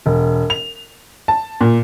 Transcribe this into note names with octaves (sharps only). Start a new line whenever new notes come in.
E1
F7
A5
A#2